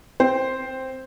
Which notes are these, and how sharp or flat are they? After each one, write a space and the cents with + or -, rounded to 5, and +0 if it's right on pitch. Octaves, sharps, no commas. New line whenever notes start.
C4 +0 C5 +0 G5 +0